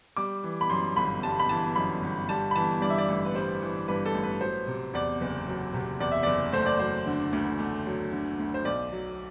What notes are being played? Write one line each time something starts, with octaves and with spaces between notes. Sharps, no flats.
G3 D6
E3
B5
F#2 C6
G1 B5
G3 A5
B5
E3 A5
F#2 B5
G1
G3 A5
B5
E3 A5
G2 D5
E5
D5
A1
B4
G3 C5
E3
G2 B4
A4
A1
B4
F#3 C5
C3
E2 D5
F#1
F#3
C3
E2 D5
E5
F#1 D5
A3 C5
D5
F#3 C5
D3
D2
A3
F#3
D3
D2
C5
B1 D5
F#3